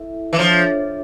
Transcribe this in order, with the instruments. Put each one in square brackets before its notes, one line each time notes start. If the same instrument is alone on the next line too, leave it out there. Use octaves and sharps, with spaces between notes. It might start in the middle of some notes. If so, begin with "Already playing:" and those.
Already playing: [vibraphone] E4 A4 E5
[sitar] E3
[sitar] F3 [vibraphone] D4 F4 A4 C#5 E5